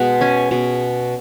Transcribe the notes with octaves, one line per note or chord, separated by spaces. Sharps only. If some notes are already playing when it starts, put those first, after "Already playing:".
Already playing: B2 G#3 F#5
C#4 G#5
B2